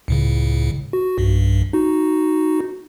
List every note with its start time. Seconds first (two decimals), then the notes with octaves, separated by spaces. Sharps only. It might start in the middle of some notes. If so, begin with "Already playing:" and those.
0.08 C#2 A2 C#3
0.93 F#4
1.18 B1 G2
1.73 D#4 F#4